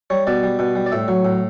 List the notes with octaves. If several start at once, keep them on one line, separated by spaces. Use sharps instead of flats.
G3 C#5
B2 D5
G3
B2
G3
D5
A2 E5
F#3
A2